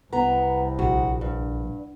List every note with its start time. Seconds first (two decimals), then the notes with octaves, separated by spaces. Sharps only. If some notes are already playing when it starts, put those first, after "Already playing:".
0.12 C2 B3 A#5
0.79 A#1 F#4
1.21 G2